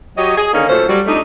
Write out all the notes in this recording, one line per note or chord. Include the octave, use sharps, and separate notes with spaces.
F#3 G4 C#5 D#5
G#4
D3 D#3 A#3 C#4 D#4
A#2 F#3 A3 C#4 A4 C5
F#3 G3
F2 A3 D4 D#4